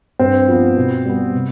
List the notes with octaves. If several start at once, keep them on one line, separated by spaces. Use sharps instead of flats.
G2 C4
F3 B3
B2
G3 B3
C3